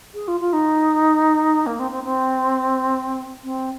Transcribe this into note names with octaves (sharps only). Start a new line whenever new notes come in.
G#4
F4
F4
D#4
A#3
C4
C4
C4
C4